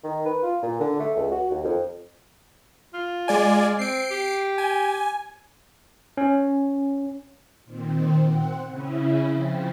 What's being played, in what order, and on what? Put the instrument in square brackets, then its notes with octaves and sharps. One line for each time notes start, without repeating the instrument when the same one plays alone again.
[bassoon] D#3
B4
F4
A#2
D3
A3
C#2
F#4
D#2
F2
[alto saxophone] F4
[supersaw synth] G#3 D5 G#5
[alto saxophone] C4 [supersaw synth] C7 D7
[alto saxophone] G4
[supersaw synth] G#5
[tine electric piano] C#4
[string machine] A#2 D#3 C4
C4 F#5
C#3 C#4 E4
C#3 F3 C4